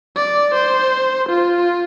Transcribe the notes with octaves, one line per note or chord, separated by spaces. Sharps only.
D5
C5
F4